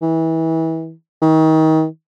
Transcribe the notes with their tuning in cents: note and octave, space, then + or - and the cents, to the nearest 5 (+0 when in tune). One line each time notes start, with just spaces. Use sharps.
E3 -30
D#3 +30